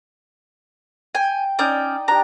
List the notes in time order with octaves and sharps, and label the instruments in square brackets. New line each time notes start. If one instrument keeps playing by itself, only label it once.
[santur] G5 [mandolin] G#5
[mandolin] C#4 G5 [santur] D#4 D5
[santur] D4 G4 [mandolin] A#5